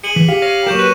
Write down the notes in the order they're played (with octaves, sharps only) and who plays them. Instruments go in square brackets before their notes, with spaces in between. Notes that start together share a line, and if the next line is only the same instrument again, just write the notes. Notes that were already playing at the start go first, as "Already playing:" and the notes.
[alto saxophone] G#4 [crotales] C#7 D#7 F#7
[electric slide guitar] E3 [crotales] B6
[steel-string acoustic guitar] G4 [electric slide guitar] F5 [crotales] B6
[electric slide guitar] C#5 [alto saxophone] F5 [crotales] A#6 D#7
[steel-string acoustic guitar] F#3 A#3 [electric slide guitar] G4 [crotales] C#6 G6 E7
[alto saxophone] B4 [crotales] C#6 D#7